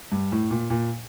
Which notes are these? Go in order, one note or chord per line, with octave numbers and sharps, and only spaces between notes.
G2
A2
A#2
A#2